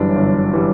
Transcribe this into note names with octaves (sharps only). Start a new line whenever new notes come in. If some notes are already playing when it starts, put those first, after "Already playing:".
Already playing: G1 F#2 E3 G3 D4 D5
G1
E3 G3